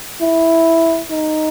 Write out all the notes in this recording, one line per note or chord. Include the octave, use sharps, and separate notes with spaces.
E4
D#4